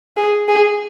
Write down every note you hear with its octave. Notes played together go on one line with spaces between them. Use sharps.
G#4
G#4